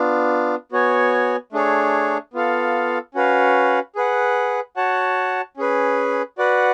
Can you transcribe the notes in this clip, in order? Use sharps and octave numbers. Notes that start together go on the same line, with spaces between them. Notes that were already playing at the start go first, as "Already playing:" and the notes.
Already playing: B3 D4 F4
B3 F#4 C#5 G#5
A3 D4 G#4 C#5
B3 F4 A4 F5
C#4 F#4 B4 F5
G#4 B4 F#5
F#4 C#5 F#5 A5
C#4 G#4 B4
F#4 B4 D5 F#5